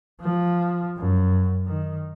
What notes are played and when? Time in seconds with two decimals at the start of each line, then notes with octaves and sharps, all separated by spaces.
0.21 F3
0.97 F#2
1.66 D#3